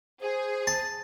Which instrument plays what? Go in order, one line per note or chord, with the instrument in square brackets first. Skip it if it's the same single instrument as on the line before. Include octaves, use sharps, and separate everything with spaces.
[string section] G#4 [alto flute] C5
[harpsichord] A5